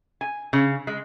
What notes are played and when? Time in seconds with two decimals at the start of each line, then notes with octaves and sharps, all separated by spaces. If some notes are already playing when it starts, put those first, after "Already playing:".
0.21 G#5
0.53 C#3
0.87 G#3